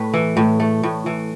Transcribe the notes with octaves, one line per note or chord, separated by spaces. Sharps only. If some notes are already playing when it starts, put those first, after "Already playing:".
Already playing: A2 A3 B4
E3
A2
A3
A2
E3